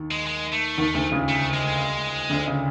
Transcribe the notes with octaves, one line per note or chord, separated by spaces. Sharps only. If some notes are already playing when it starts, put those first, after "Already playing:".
Already playing: D#2 D#3
G#3
G#3
A3
D#2 D#3
D2 D3
C#2 C#3
A3
G#3
D2 D3
C#3